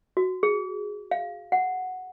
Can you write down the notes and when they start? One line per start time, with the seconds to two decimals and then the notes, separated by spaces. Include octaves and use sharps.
0.17 F#4
0.43 G#4
1.11 F5
1.52 F#5